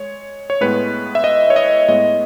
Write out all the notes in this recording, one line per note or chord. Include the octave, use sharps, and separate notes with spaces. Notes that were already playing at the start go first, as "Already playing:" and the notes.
Already playing: G#3 C#5
C#5
A2 G#3 B3 B4
E5
D#5
C#5
D#5
A2 G#3 B3 D#5